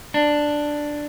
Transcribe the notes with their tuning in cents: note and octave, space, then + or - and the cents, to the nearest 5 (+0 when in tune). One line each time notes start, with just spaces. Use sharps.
D4 +5